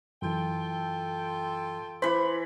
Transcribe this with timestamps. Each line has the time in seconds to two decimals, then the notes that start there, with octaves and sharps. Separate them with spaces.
0.22 F#2 E3 F4 A4 G5
2.02 E3 C5 B5